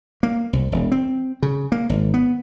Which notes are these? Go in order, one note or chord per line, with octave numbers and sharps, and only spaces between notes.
A#3
C2
E1
C4
C#3
A#3
G#1
B3